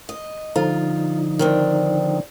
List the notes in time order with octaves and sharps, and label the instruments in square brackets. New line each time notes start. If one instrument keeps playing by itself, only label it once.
[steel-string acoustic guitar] D#5
[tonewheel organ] D3 F3 D#4 [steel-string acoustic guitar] F4
[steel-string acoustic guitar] D#3 C4 D4